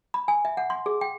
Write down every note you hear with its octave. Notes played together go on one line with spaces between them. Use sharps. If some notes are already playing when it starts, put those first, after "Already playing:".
B5
G#5
E5
F#5
C6
G#4
G5